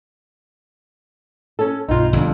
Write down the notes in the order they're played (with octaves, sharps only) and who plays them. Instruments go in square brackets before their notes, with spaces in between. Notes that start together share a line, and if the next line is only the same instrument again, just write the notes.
[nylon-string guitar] C#4 A4
[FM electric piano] B1 G2 B2 [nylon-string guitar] D#4 F4
[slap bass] G1 [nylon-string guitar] F2 D4